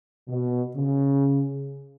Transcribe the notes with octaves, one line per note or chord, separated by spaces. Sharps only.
B2
C#3